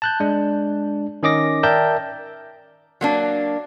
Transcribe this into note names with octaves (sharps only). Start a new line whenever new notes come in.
A5 F#6 G6
G#3 D4
D#3 C#4 D#5 D6 A#6
A#4 D5 E5 G5 A5 G6
F#3 A#3 D4